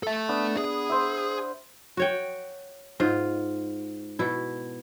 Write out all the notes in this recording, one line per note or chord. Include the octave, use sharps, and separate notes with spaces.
A4 E5
B3 D4
G#4
C5 E5
F#4 C#5 G5
G#2 F4 D#5
B2 E4